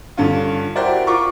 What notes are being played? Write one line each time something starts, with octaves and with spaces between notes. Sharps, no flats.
G2 D3 C#4 F4
E4 F#4 G4 A#4 C5 D5
F4 A#4 F5 A#5 C#6 D6